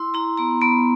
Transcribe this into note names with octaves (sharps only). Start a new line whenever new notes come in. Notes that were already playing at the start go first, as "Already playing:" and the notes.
Already playing: E4 C6
E4 A#5
B3 A#5
B3 B5